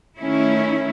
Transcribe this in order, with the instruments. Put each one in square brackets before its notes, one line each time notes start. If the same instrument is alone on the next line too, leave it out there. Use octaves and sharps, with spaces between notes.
[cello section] D#3 A3 C#4 E4